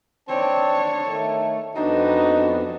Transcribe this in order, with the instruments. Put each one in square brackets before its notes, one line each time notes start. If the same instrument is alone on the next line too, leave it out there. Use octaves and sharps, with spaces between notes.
[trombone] C4 [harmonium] D4 [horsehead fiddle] C#5 [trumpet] A5
[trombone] D#3 [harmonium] A3
[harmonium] F2 B3 [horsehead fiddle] D4 [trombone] D#4 [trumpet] F#4